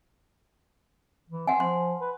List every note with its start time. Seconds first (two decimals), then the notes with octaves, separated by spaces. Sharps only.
1.30 E3
1.47 C4 F#5 G#5
1.60 F3 C6
2.01 B4